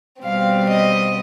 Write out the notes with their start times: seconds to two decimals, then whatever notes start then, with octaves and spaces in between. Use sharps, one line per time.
0.22 B2 G3 C4 F5
0.68 D#5